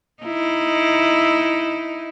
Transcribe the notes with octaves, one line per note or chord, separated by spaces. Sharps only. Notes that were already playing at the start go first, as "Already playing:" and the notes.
D#4 E4